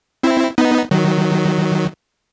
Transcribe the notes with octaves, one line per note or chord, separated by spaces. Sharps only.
C4 E4
B3 D#4
D#3 F#3